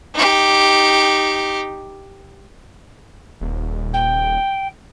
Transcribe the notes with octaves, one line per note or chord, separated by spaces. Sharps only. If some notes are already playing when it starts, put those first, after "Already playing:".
D#4 G4
D#1
G5